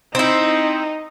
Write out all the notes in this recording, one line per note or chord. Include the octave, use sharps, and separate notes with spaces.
C4 D#4 E4